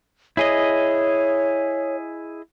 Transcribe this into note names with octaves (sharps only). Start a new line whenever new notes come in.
E4 G#4 C#5 D#5